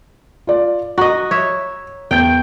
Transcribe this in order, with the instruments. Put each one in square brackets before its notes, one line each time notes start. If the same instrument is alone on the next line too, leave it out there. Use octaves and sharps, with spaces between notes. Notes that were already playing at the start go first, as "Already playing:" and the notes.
[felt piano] F4 D5
[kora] F#4 D#5 [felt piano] A#5
[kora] C#5 E5
[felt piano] E2 G6 [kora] G5